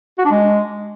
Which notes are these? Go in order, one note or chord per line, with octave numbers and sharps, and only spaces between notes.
F#4
D4
G#3